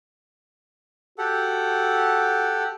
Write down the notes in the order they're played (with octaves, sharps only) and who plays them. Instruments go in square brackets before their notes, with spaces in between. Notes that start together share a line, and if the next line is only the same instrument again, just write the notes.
[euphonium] F#4 [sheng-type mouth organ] G4 A4 F#5